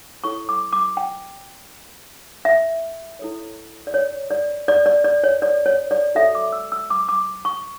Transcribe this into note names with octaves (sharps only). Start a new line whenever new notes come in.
E4 A4 C#5 C#6
D6
D6
G5
E5
E4 A4 C#5
D5
C#5
D5
D5
D5
D5
C#5
D5
C#5
D5
F#4 A4 C#5 E5
D6
E6
E6
D6
D6
C#6